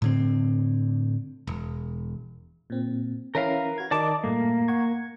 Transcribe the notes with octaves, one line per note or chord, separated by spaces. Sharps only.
A2 D3 C4
E1
A#2 C4
E3 C#4 E4 A#4 B4 F5
F#4 G#6
D#3 A#4 D5 D#5 A5 D6
G2 A#2 A3 A#3
F#5 C#6 G#6